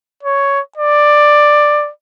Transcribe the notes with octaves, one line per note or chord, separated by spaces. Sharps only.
C#5
D5